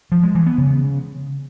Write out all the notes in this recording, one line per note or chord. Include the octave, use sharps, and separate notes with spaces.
F3
G#3
E3
B3
C#3